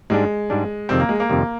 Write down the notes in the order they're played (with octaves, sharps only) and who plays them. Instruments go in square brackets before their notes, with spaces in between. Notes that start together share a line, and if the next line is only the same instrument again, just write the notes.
[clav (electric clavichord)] G#2 G3 D4 [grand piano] G#3
[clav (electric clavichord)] G#2 G3 D4
[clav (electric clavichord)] F2 C3 D#3 G3 [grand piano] C4
[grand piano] A#3
G#3
A#3
[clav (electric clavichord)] F2 C3 D#3 G3